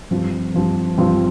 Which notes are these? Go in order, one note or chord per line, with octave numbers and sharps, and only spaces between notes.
G2 F3 C4 F4
G2 F3 C4 F4
G2 F3 C4 F4